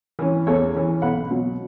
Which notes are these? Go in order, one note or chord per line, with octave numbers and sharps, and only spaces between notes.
E3 C#4
E2 A4 C#5
E3 C#4
B1 F#5 B5
B2 F#3